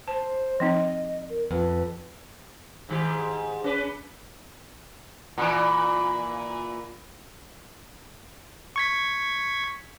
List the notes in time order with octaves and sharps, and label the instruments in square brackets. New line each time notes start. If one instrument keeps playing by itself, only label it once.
[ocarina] C5 [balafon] A5
[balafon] F3 C4 D#4 [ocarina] D#5
[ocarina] A#4
[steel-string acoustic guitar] F2 [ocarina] B4
[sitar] G#2 D#3 G4
C#4 B4
A#2 E3
[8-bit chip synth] C#6 G#6 B6